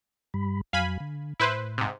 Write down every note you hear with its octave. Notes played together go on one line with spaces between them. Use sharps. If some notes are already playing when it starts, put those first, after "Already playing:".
G2 G3 B5
F2 F#3 F5 G#5 B5
D3
A2 E4 B4 C5
G#2 C3